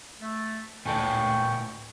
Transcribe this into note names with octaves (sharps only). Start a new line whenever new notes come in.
A3
A1 D2 A#2 A4 G5 G#5 C#6